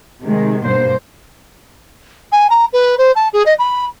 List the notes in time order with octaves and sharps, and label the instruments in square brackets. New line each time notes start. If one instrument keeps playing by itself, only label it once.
[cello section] C3 D#3 G#3
G2 B2 A#3 C5
[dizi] G#5
A#5
B4
C5
A5
G#4
D#5
B5